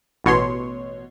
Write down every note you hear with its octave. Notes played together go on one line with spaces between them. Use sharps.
A1 B2 C#5 C6